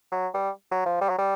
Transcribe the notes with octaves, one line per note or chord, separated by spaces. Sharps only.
F#3
G3
F#3
F3
G3
F#3
G3